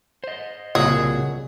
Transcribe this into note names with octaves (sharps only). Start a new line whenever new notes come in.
C5 D#5
C2 A#2 C#3 F#3 G#4 D#5